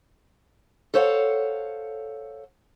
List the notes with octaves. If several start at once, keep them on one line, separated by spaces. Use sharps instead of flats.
A4 C5 C#5 F5 F#5